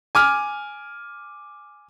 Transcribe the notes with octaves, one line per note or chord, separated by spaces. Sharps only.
G#5 D6 F6